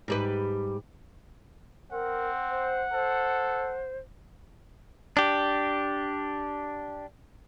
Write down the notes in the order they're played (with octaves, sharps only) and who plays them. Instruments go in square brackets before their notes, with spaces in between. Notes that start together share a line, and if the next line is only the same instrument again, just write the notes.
[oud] G#2 G3 B4
[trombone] C4 [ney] A#4 [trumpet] F#5
[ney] C5
[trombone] A4 [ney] C5
[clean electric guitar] D4 G4